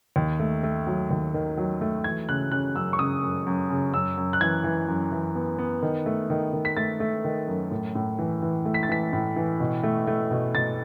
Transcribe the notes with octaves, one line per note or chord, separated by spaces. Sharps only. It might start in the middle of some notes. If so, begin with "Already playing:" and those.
D#2
A3
A3
F#3
D#2
D#3
F#3
A3
E3 G#6
C#3 F#6
C#3 F#6
F#2 E6
C#6
C#3 D#6
F#2
F#2
C#3
F#2 E6
F#2
F#6
E3 G#6
E3
F#2
E3
B3
B3
D#3
A3
D#3
D#3
B6
A3 A6
A3
D#3
F#2
A2
A2
E3
E3
A3
B6
A6
E3 B6
A2
E3
B2
A3
A3
B2
B2 A6